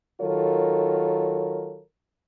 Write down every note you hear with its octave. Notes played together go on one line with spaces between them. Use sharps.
D#3 F#3 F4 A4 A#4 C#5